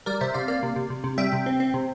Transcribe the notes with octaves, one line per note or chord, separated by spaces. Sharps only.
G3 A#4 D5
C3 C5 E5
C3 D5 F5
A#3 D5 F5
C3
C3
C3
C3
G3 E5 G5
C3
C4
C4
C3